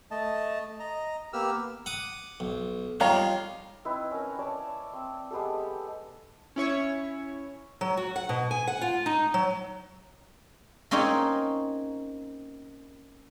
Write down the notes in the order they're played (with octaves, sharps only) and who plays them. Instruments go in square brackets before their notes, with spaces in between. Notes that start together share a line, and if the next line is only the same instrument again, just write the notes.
[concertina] A3 D#5 A5
D#5 A#5
A#3 B3 G4 E6 F6
[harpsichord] F#5 D6 D#6
B1
[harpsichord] G3 D#4 F4 [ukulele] C#5 F5 A#5
[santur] C4 D#4 E4 B4
C#4 A#4
C#5 D5 A5
C4
G#3 B3 G4 A4
[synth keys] C#4 E4 C#5 C#6
[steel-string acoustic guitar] F#3
F#4
F#5
B2
G#5
F#5
F4
D#4
F#3
[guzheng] A#3 C4 C#4 D#4 G#4 C#5